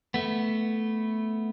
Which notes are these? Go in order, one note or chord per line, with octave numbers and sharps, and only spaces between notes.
A3 B3